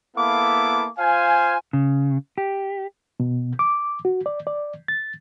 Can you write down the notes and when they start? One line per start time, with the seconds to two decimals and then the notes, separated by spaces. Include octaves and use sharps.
0.17 A#3 B3 E4 A4 F5 D6
0.98 F4 C5 F5 G#5
1.73 C#3
2.38 G4
3.20 B2
3.59 D6
4.05 F#4
4.26 D5
4.47 D5
4.88 A6